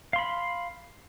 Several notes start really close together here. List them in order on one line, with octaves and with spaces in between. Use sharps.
F5 C6 B5